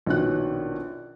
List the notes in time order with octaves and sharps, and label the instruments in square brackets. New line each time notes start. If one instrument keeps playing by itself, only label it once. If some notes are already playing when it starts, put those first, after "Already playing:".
[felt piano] A#1 B2 D#3 C#4 F#4 F#6